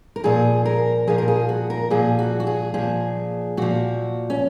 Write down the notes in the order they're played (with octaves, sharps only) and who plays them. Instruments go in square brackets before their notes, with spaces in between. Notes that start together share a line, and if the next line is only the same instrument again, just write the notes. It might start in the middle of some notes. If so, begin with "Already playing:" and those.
[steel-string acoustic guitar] A#4
A#2 F3 G#4
A#4
A#2 F3 G#4
A#4
G#4
F#4
A#4
A#2 F3 G#4
F#4
F#4
G#4
A#2 F3 G#4
A#2 F3 F#4
C#4